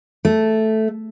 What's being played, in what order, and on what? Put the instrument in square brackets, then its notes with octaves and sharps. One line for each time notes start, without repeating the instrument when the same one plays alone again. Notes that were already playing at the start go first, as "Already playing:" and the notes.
[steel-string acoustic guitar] A3